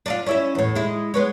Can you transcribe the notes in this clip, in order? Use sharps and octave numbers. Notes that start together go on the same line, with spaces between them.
D4 D#4 F4
C#4 E4 E5
E2 A2
G#3 E4
G#3 B3 C#5